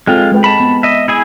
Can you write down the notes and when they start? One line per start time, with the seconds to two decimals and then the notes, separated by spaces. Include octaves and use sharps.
0.07 G#3 C4 F4 A4 G5
0.32 G#3 B4 G5
0.44 A5 B5
0.60 B3
0.83 D#5 E5
1.08 E4 G#4 G#5